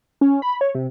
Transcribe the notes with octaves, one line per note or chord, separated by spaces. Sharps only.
C#4
B5
C#5
C3